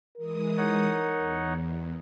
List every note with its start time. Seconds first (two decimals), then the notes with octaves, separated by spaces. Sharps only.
0.17 E3 G#3 A#4 D#6
0.57 D#4 C#5 F#5
1.16 E2